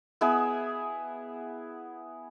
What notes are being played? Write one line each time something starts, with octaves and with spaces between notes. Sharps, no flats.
B3 E4 G#4 E5